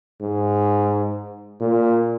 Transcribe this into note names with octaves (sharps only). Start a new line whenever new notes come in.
G#2
A#2